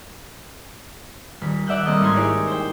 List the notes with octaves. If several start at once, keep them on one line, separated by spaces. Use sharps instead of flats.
D#1 B6
D5 E5 F#5 F#6 G6
G3 A#3 C4 A4 D#5 F#5
G#1 C#4 D#4 C6 G#6
D#4 E4 G4 G#4 C#5 D5
C5 G5